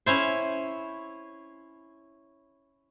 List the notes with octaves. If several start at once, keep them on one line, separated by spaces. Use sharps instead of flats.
C#4 E4 C5